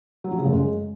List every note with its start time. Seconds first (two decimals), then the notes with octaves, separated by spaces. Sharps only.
0.24 F#3
0.31 F3
0.38 C#3
0.45 F#2
0.53 G#3